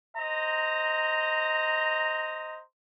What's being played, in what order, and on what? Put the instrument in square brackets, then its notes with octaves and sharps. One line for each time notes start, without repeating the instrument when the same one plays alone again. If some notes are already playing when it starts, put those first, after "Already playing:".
[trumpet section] C5 D#5 A#5